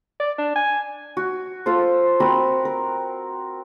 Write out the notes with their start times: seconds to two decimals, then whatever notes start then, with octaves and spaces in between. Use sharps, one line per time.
0.20 D5
0.38 D4
0.56 G#5
1.17 F#4
1.66 F4 A4 C5
2.20 C4 F#4 A#4 B5
2.65 A#4